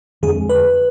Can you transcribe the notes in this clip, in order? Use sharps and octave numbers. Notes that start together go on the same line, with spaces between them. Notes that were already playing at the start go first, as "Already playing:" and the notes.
F2 D3 G#3 C4 G#4
B4